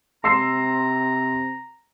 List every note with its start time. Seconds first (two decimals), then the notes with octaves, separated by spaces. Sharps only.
0.24 C3 A#5 C6 E6 C7